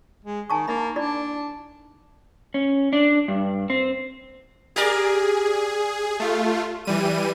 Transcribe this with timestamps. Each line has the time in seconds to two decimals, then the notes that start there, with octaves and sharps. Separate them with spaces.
0.24 G#3
0.50 D#3 G#5 A5 C#6
0.68 A#3 D#4 E5 B5
0.96 D4 E4 D5 B5
2.54 C#4
2.93 D4
3.28 G2
3.70 C4
4.76 G4 G#4 A#4 D5
6.20 A3 F4
6.85 E3 G3 D#7